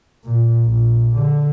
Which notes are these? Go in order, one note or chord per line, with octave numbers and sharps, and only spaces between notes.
A#2
A#1
D3